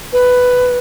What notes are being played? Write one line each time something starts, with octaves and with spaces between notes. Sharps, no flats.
B4